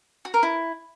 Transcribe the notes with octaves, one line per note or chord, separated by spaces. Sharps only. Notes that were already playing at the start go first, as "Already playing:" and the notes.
F#4
A#4
E4